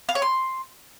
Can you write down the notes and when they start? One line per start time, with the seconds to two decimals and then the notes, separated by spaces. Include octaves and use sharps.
0.09 F5
0.15 C#5
0.22 C6